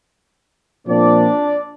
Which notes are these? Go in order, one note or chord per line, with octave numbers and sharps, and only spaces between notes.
A#2 F3 C4 D4 D5